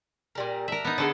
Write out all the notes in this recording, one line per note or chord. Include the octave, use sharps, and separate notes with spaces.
A#2 G3 A#4
D4 A#4 E5
B3 D#4
D3 G#4 A4 F#5 A5